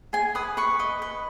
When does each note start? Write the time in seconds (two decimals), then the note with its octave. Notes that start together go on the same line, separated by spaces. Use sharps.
0.13 G#4 G#5
0.35 B4 D#6
0.57 B4 C#6
0.80 D#5
1.02 B4